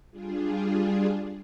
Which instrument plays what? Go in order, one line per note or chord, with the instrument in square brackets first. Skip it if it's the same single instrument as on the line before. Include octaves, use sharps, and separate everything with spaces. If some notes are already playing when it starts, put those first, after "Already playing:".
[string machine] G3 D4 F4 G#4